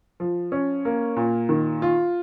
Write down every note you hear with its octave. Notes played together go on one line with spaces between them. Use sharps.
F3
C#4
A#3
A#2
D#3
F4